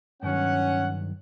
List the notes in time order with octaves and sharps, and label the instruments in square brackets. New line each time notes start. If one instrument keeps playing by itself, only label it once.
[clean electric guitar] G2 D#3 F#3 [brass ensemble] C#4 F#5